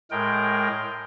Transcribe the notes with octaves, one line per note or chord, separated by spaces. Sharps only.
A2 G#3 A#4 G5